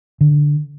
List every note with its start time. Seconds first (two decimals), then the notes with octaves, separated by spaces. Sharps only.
0.21 D3